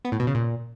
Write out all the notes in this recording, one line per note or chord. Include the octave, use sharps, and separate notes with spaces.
B3
A2
B2
C#3
A#2